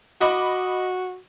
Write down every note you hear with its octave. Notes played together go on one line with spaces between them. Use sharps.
F#4 D#5 B5 D6